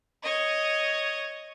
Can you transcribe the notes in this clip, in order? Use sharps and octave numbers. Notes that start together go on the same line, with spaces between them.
C#5 D#5